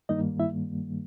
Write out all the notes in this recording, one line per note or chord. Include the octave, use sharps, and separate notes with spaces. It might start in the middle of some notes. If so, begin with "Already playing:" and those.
G2 D#3 G3 A#3 D#4 D#5
E4 E5